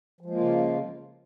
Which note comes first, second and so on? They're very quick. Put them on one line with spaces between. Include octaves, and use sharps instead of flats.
F3 G#3 A#3 F4 C#3